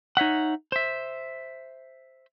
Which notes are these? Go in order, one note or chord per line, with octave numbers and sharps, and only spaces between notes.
D#4 C#5 E5 F#5
C5 E5